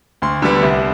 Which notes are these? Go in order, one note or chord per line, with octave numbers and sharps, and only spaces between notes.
D2 C6
D3 G3 B3
C2